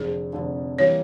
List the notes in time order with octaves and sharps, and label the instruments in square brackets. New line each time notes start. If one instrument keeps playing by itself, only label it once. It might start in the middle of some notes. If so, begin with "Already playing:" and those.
Already playing: [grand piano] F1 F2 D3 [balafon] G#4
[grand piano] F1 F2 D3
[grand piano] E3 G3 A#3 [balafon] C#5